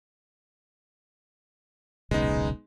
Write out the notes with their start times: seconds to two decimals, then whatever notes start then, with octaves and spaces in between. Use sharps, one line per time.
2.11 D#1 B1 C#3 G#3 B3 D#4